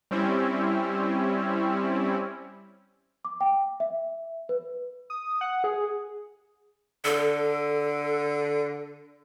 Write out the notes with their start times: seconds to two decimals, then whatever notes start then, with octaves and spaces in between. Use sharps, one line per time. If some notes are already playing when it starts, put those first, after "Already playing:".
0.11 G3 C4 C#4 E4
3.25 D6
3.41 G5
3.80 E5
4.49 B4
5.10 D#6
5.41 F#5
5.64 G#4
7.05 D3 A4